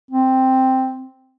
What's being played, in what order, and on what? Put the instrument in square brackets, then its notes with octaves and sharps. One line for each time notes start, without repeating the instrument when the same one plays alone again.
[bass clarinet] C4